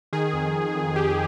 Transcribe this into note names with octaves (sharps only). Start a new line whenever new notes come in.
D#3 G#4
F2
D#3
F2
D#3 G4